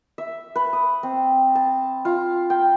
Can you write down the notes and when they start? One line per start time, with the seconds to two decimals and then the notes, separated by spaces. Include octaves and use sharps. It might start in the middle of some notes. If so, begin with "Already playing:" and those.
0.18 E5
0.55 B4
0.73 D#6
1.03 C4
1.55 A5
2.05 F4
2.50 G5